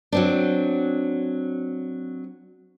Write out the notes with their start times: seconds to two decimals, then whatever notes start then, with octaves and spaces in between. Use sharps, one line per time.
0.12 F#3 C4 D4